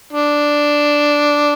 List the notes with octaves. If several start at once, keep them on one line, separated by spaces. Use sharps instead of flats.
D4